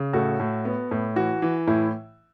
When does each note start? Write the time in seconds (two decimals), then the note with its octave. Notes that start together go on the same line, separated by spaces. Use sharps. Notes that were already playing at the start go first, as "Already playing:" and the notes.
Already playing: C#3
0.13 A2 F#4 A4
0.40 A2
0.65 B3
0.91 A2
1.16 E3 F#4
1.42 E3
1.67 A2 E4